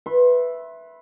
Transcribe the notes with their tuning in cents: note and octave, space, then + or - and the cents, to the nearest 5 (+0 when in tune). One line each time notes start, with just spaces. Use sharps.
B4 +0 E5 +0 C6 +30